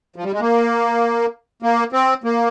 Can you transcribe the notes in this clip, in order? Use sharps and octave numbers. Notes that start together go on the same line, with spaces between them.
F3
G3
G#3
A#3
A#3
C4
A#3